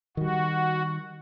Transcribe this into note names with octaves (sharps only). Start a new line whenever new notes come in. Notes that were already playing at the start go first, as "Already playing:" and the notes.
D#3 G3 F#4